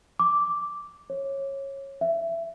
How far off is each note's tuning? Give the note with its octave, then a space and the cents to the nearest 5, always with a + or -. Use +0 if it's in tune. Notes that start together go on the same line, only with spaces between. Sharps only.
D6 -5
C#5 -20
E5 +20